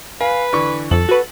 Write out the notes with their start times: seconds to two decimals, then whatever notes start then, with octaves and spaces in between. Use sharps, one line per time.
0.21 B4 F5 G#5
0.53 D3 E3 C#6
0.91 F2 A4 F#7
1.09 F#4 B4